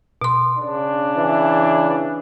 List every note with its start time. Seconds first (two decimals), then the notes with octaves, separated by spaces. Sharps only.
0.22 B2 C6
0.58 C#3 D4
1.17 E3